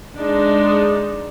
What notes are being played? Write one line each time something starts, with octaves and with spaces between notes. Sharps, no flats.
G#3 D4 D#4